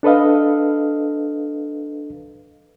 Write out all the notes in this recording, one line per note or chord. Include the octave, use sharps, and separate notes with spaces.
D4 A4 B4 D#5 F5